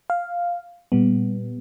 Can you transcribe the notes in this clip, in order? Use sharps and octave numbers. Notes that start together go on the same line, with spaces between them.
F5
A#2 G3 B3